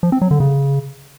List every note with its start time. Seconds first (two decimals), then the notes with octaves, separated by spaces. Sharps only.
0.03 F3
0.12 C4
0.22 F#3
0.31 D3
0.40 C#3